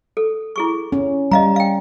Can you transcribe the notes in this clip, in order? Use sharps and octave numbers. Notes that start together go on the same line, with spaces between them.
A4
E4 G#4 C#6
C#4
G3 D#5 F5 A#5
F5 G5